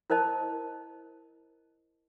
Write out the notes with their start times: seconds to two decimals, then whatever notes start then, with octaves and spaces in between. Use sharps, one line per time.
0.10 E4 A#4 C5 D#5 A5